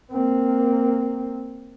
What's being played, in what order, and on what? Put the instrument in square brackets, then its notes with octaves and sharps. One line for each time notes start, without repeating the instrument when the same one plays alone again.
[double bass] A#3 C4